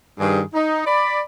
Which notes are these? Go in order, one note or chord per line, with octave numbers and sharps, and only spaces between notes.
G2 D#3 G#4
D#4
D5 B5